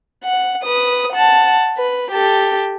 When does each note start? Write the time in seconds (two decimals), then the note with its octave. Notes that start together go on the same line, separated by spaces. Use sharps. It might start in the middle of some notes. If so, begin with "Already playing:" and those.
0.24 F#5
0.63 B4 D#6
1.12 F#5 A5
1.77 B4
2.11 G4 A4